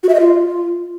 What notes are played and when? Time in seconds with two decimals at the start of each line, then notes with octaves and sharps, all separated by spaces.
0.03 F#4
0.09 E5
0.14 D#5
0.20 F4